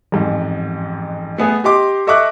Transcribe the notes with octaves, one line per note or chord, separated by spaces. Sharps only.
A1 F2 G#2
A3 B3 G#4
G4 D#5 C6 D6
A4 D#5 E5 C#6 D6 F#6